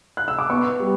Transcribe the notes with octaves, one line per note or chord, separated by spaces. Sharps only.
F#6
E6
D6
B3 C#6
G3